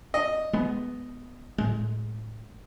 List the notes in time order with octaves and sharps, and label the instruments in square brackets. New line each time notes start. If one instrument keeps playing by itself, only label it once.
[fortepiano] D#5
[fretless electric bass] G#3 B3
A2 G#3